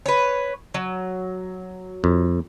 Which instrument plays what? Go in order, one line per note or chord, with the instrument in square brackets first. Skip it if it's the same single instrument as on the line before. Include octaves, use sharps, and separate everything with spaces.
[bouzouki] B4 C#5
F#3
[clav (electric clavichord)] F2